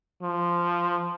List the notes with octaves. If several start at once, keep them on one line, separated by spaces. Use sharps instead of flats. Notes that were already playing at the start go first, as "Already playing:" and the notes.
F3